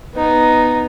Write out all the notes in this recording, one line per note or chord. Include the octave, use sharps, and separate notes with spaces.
B3 D#4